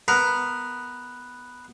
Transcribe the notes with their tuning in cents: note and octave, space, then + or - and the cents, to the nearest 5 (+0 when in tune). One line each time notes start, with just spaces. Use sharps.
B3 +0 A#4 +0